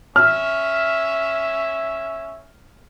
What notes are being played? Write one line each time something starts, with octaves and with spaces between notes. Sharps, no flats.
C#4 E5 F6